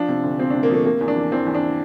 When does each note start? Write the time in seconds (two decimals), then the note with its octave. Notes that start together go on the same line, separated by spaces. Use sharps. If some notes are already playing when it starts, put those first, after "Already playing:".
Already playing: F3 D4
0.09 C3
0.24 D2
0.39 F3 C4
0.50 C3 D4
0.63 A#3
0.70 F3 A3
0.85 C3 A#3
1.01 E2
1.08 D4
1.16 E3
1.32 E2 C4
1.47 E2
1.55 D4